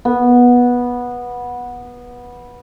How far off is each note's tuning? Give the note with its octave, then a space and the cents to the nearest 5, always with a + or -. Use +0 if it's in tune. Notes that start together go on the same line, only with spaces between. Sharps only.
B3 -15